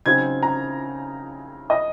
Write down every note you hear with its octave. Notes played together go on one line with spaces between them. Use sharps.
C#3 F#3 C4 D#4 G#6
A#5
D#5